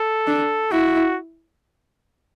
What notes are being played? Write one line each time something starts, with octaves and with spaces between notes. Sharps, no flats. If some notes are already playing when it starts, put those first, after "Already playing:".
Already playing: A4
D4
E4 F#4